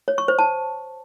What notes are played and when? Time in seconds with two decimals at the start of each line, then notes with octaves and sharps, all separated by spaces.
0.08 C#5
0.18 C#6
0.28 C5
0.39 A5